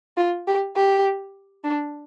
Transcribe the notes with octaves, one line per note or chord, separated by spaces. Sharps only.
F4
G4
G4
D4